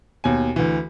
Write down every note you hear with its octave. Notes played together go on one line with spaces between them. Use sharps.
D#2 B2 G#5
D2 E3